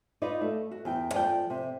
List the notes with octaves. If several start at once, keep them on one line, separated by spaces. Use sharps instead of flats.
D#4 F4 B4 D5
A3
F#4
E2 G5
F3 D5 G5
C3